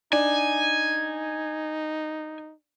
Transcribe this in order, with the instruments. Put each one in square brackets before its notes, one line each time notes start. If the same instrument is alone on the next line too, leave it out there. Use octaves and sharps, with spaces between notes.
[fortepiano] D4 [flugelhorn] D#4 [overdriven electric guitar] G#5